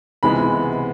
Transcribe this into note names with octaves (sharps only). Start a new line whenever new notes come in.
C#2 C3 E3 G#3 B3 B5